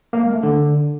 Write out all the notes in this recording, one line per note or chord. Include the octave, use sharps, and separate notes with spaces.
A#3
G#3
A3
D3